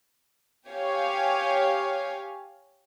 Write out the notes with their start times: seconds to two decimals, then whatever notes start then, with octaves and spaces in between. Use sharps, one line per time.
0.69 G4 C#5 F5 G#5